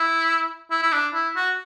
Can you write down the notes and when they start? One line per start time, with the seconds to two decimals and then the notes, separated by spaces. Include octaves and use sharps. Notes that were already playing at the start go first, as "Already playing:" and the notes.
Already playing: E4
0.71 E4
0.82 E4
0.92 D4
1.14 E4
1.36 F#4